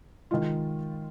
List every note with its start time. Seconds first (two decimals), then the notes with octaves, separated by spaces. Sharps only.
0.31 D#3 G#3 F4